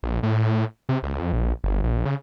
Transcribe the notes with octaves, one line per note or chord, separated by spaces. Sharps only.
A#1
A2
C3
C#2
F2
A#1
G1
A#1
C#3